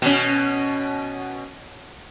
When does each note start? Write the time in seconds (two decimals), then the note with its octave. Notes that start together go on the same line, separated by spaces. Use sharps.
0.02 B2 C#4